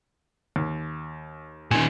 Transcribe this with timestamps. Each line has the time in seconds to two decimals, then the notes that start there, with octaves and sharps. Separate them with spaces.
0.56 D#2
1.71 A#2 D#3 G#5